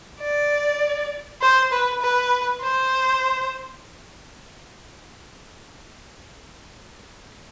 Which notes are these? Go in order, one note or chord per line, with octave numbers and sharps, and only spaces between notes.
D5
C5
B4
B4
C5